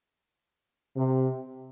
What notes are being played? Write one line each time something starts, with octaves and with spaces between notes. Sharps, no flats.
C3